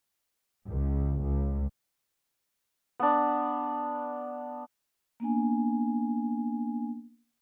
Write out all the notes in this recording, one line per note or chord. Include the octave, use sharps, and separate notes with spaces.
C#2
C#2
B3 D4
A#3 B3 D4 G#5